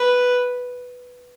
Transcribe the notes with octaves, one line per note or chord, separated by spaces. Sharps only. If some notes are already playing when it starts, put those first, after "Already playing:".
Already playing: B4